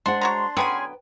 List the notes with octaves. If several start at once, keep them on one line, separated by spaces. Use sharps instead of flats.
G#3 D4 C5 F#5 C6
F#4 C#5 A#5 C6
D3 F#3 B3 C#4 G#4 B4 G5 G#5